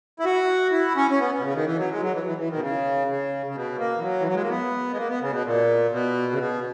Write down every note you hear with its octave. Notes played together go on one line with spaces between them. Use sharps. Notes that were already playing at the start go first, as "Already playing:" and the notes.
E4
F#4
E4
C#4
C#4
B3
B2
C#3
D#3
E3
F#3
G#3
F#3
E3
E3
E3
D#3
B2
C#3
C#3
C#3
B2
A#3
E3
F#3
E3
F#3
G#3
A#3
B3
G#3
A#3
B3
C#3
B2
A#2
B2
C#3
B2